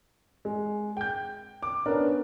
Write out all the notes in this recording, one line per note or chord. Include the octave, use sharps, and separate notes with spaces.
G#3
G5 G6
D6
B3 C#4 D4 A#4 D5